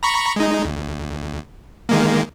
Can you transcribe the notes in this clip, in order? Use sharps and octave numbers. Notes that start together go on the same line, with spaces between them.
A#5 B5 C#6
G#3 D#4
D2
D#3 G#3 A#3